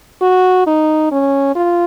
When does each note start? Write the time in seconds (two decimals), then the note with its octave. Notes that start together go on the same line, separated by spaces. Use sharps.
0.22 F#4
0.67 D#4
1.11 C#4
1.56 F4